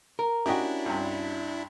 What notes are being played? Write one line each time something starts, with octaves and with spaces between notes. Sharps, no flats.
A#4
C#4 D4 E4 F#4 G4 D#5 G5
C2 G2